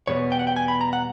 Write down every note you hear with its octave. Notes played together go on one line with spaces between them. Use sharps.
E2 B2 G3 B3 C#5
G5
F#5
G5
G#5
B5
A#5
F#5